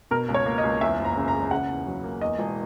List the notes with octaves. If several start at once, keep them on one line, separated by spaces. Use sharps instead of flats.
B2 A#4
C#2
C#5
A#3
D#5
C#2
E2 E5
F#1
A#5
C#3
A#5
G#3
C#3 F#5
E2
F#3
A#3
E2 D#5
E1